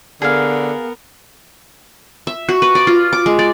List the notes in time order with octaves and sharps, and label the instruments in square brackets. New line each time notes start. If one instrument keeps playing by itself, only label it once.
[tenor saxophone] D3 [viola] B3 A#4 [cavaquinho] G#4 F5
[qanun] E5
F#4
B4
D5
F4
D6
G#3
D5